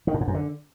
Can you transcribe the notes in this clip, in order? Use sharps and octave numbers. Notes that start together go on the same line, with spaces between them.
D#3
A2
G#2
F#2
D3